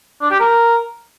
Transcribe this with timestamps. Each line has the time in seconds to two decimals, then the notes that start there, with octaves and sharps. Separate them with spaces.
0.21 D4
0.31 G4
0.40 A#4